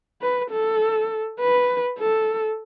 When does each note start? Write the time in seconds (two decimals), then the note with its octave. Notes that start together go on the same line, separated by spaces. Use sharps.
0.22 B4
0.51 A4
1.39 B4
1.99 A4